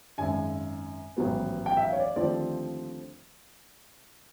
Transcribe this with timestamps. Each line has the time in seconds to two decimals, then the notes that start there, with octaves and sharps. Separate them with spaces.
0.18 G#1 F#2 D#3 G#3 G#5
1.17 A1 G#2 D#3 F#3 B3
1.66 G5
1.77 E5
1.83 F5
1.93 C#5
2.00 D5
2.16 D#2 D3 F3 A3 C4 D5